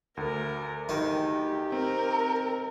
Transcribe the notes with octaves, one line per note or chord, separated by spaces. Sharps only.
D2 A#4
D#3 G4
C4 A#4